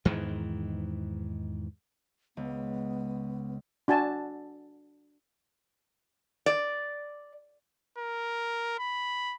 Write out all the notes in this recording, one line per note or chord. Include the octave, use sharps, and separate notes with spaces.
E2 G#2 D#3 E3
C#2 B3
D4 F#4 G#5 A5
D5
A#4
B5